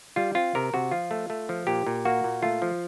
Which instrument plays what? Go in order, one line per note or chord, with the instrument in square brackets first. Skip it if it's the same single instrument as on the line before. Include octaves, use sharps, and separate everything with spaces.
[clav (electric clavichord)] G3 F4
C4 F4
C3 A#4
C3 F#4
F3 F4
A3
A3
F3
A#2 G4
A#2
A#3 F#4
A#2
A3 F4
F3